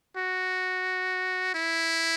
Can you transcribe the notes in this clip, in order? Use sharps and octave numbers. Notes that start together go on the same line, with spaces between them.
F#4
E4